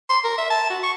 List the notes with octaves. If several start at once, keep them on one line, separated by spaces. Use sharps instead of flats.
C6
A#4
E5
A5
F#4
C#6